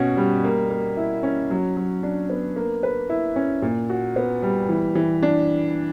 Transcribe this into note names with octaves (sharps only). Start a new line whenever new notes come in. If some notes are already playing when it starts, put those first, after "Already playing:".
Already playing: B2 C#4 F#4
G3
A#3
A#3
E4
C#4
F#3
F#3
D4
B3
A#3
B4
E4
C#4
A#2
F#4
B3
G3
E3
E3
D4